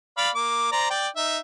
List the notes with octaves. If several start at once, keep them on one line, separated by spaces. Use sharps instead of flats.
D5 F5 B5
A#3 D6
C5 D5 A#5
D5 G5
D#4 E5